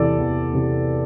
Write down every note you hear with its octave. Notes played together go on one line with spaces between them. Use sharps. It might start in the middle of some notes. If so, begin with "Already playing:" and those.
Already playing: E2 C3 E3 A4 D5
E2
C3 E3